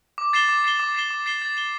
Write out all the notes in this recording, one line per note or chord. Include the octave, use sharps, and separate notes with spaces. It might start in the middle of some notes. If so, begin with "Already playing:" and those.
D6
A6 C7 E7 G7
D6
A6 C7 E7 G7
D6
A6 C7 E7 G7
D6
A6 C7 E7 G7
A6
E7 G7